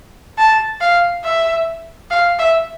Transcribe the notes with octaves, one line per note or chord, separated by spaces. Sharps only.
A5
F5
E5
F5
E5